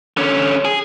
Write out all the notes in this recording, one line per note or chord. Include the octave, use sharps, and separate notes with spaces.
D3 C#4
G#4